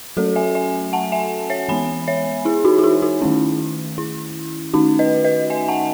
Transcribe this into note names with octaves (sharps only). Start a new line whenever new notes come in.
F#3 A3 C#4 F#4 A4
E5 G#5
E5 G#5
F#5 A5
E5 G#5
C#5 E5
E3 G#3 B3 G#5 B5
C#5 E5
E4 G#4
D#4 F#4
F#4
E4 G#4
D#4 F#4
D#3 A3 C#4 E4
E4
D#3 A3 C#4 D#4 F#4
B4 D#5
B4 D#5
E5 G#5
F#5 A5